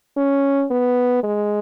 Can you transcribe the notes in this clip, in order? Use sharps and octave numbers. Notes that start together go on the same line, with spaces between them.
C#4
B3
G#3